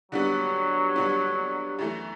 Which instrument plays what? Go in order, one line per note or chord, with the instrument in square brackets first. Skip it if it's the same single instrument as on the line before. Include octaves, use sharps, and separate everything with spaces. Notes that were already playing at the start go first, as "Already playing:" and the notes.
[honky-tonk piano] D3 G3 B3 [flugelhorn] F#3
[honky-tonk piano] D3 G3 B3
F#2 E3 A3